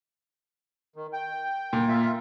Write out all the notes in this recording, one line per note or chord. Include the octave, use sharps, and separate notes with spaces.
D#3
G5
A#2
F4 E5